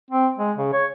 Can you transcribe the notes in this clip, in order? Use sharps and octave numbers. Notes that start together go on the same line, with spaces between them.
C4
G#3
C#3
C#5